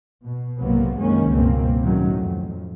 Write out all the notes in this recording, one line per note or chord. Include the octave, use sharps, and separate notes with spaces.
B2
B1 G#2 C3 F#3 A#3 B3
F#2 C3 D#3 G#3 A#3 C#4
C#2 G2 B2 A#3 C4
A2 D#3 F#3 C#4
F2